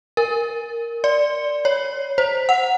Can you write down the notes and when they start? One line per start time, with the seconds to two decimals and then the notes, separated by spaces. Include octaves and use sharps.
0.17 A#4
1.04 D5
1.65 C#5
2.18 C5
2.49 F#5